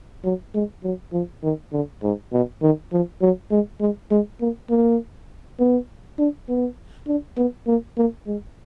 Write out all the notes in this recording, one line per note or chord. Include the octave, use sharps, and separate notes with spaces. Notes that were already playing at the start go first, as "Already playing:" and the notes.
F#3
G#3
F#3
F3
D#3
D3
G#2
B2
D#3
F3
F#3
G#3
G#3
G#3
A#3
A#3
B3
D4
B3
D4
B3
A#3
A#3
G#3